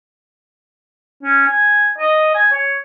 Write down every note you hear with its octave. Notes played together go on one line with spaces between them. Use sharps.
C#4
G#5
D#5
G#5
C#5